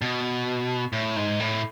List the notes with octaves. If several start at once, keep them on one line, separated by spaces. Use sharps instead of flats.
B2
A2
G#2
A2